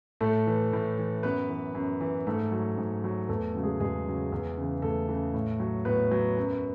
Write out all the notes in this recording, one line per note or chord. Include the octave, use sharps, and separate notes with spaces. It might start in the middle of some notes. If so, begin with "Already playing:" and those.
A2 A3 A4
E3
A2
E3
F#2 B3 B4
E3
F#2
E3
G#2 A3 A4
F#3
G#2
F#3
E2 A3 A4
C#3 F#3
G#3 G#4
E2 G#3 G#4
C#3 F#3
E2
C#3 E3
E2 A3 A4
C#3 E3
A2
F#3
A2 B3 B4
F#3
F#2